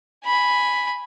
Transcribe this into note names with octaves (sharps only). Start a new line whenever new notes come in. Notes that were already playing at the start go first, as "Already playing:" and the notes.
G#5 B5